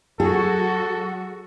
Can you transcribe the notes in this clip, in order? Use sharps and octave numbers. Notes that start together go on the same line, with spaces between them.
F#3 F#4 G#4 A4